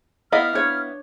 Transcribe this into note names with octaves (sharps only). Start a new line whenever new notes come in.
B3 E4 D#5 F5 F6
D4 C#5